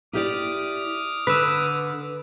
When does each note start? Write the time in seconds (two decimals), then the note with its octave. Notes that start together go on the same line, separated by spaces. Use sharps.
0.13 E4 G4 D5 D6 D#6 F6
1.27 D3 B4 E6